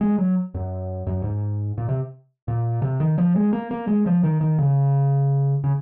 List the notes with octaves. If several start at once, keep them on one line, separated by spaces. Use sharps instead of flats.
G#3
F#3
F#2
F#2
G#2
A#2
C3
A#2
C3
D#3
F3
G#3
A#3
A#3
G#3
F3
D#3
D#3
C#3
C#3